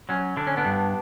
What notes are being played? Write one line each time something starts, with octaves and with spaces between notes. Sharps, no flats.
F#3 C#4
D3 D4
C#4
B3 D4
G2